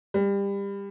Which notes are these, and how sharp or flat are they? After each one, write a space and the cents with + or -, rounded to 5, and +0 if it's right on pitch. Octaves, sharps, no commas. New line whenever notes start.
G3 +25